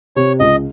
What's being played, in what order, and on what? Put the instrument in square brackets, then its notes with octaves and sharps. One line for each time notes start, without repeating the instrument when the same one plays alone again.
[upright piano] C3 [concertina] C#5
[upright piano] C#2 [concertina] D#5